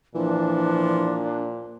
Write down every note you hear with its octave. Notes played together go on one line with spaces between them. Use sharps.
A#2 E3 F3 D4